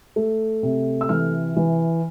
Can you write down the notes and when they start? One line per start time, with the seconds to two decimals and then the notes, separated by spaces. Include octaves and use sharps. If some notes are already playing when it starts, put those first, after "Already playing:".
0.16 A3
0.63 C3
1.01 E6
1.09 E3 F6
1.56 E3